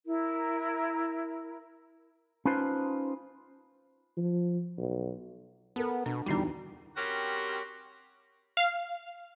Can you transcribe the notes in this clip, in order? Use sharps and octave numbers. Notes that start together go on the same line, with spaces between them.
E4 A#4
C#4 D#4 F4 B4 C5 A5
F3
B1
B3 A4 A#4
B2 D4
D1 E2 G3 D4 D#4 F#4
G3 C4 C#4 F#4 G4 A#4
F5